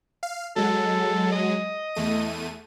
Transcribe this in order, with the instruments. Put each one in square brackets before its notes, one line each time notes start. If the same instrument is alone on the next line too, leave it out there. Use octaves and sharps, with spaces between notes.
[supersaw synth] F5
[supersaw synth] F#3 G#3 [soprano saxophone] A4
[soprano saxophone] D#5
[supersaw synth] E2 A3 D#7